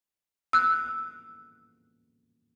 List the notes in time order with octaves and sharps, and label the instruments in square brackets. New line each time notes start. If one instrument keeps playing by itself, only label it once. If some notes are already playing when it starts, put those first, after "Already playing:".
[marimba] E6 F#6